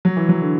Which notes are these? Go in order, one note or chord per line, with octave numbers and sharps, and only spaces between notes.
F#3
E3
F#3
D3